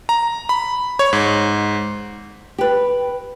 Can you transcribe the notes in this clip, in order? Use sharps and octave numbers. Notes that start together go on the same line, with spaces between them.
A#5
B5
C#5
G#2
G4 B4